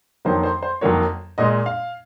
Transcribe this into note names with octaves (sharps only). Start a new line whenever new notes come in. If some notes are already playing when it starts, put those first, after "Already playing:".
F2 D#3 F#3 A#3 C5
C5
C5
F2 D#3 F#3 A#3 C#5
A#2 G#3 D#5
F5